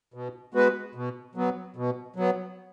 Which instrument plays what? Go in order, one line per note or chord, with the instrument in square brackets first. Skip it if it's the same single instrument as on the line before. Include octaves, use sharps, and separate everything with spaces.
[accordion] B2
G#3 B3 F#4 B4
B2
F#3 B3
B2
F#3 B3